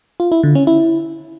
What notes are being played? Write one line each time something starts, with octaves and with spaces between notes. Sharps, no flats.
F4
E4
D3
C#4
E4